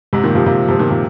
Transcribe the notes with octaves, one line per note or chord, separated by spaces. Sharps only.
G#2 C3
A#2 D#3
C3 F3
C3 F3
C3 F3
A#2 D#3
C3 F3